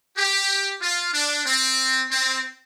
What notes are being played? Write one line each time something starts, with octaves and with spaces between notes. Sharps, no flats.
G4
F4
D4
C4
C4